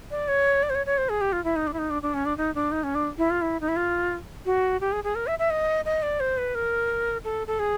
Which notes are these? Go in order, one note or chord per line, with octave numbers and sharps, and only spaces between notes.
D5
C#5
D5
C5
C#5
C#5
C5
G#4
G4
F4
E4
D#4
D4
E4
D#4
D4
D4
C#4
D4
D#4
D4
D#4
C#4
D4
E4
F4
E4
D#4
E4
F4
F#4
G4
G#4
G#4
A#4
E5
E5
D#5
D#5
D5
C5
B4
A#4
A4
A4
G#4